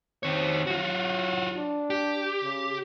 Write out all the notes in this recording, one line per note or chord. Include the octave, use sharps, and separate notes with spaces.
D#3 C4 C#5
F#3 F4 F#4
D4
G4
C#3